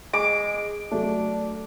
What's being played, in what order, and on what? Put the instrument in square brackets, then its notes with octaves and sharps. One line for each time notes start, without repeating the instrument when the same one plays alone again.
[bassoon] G#3 [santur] D6
[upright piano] F#3 A3 [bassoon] D4